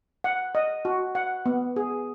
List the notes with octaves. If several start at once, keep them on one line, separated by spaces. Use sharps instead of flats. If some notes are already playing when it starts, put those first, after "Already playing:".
F#5
D#5
F#4
F#5
B3
G#4